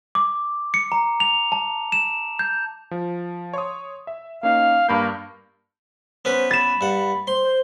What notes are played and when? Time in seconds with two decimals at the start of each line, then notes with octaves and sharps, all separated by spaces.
0.15 D6
0.74 C#7
0.92 A#5
1.20 F7
1.52 A5
1.92 E7
2.39 G6
2.91 F3
3.53 C#5 C6 D#6
4.07 E5
4.43 A#3 C#4 D#4 F5
4.89 G2 A#3 B5 G6
6.25 B3 C#4 B4 C5
6.51 B5 A6 E7
6.81 G2 F#5
7.27 C5 C6
7.44 C5